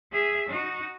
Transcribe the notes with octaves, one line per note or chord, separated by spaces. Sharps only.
G#4 E5
D#4 F#4